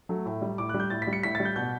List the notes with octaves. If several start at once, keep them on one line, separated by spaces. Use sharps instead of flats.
F#3 A3
A2
G3
A2 D6
G3 F#6
G6
A2 A6
B6
G3
C#7
A2 B6
G3 A6
G6
B2 G6